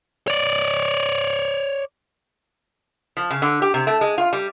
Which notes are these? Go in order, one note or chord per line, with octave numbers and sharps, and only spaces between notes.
C#5 D5
F3
C#3
D3
G4
C3
A3
G#3
F4
G3